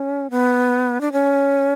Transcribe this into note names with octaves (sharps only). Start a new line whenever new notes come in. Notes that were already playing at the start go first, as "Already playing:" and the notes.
Already playing: C#4
B3
D4
C#4